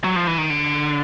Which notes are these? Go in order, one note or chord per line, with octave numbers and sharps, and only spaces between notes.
F#3
F3
E3
D#3
D3